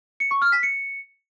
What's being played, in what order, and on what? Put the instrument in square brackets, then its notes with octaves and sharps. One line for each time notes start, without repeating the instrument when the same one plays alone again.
[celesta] C#7
C#6
F6
B6
C#7